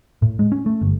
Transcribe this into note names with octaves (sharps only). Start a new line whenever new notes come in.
A2
G#3
C#4
A3
G1